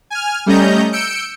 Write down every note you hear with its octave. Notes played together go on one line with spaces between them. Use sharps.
G#5 F6
G3 A3 C#4 D#5 A#5 G6
E6 G6 C#7 D7